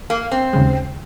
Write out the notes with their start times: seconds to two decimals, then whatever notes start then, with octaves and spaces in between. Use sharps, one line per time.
0.10 A#3
0.32 C4
0.53 D#2 C#3 G#3